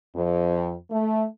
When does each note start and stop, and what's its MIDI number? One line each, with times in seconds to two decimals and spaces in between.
0.15 0.74 41
0.90 1.25 57